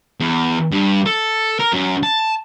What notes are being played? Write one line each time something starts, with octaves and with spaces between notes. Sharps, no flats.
E2
G2
A4
A#4
F#2
A5